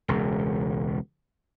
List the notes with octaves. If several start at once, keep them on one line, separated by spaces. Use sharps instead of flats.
E1 C#2